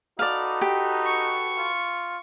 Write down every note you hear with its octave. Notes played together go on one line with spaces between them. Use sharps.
D#4 F#4 A4 B4 D5 F5
G4
C#6
F4